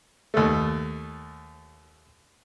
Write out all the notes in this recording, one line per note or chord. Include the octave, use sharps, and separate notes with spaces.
D#2 A3